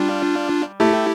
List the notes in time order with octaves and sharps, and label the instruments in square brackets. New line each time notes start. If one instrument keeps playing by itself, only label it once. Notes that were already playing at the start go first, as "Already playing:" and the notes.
Already playing: [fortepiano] G3 [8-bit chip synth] D4 F4
[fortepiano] A3 [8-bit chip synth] E4 G4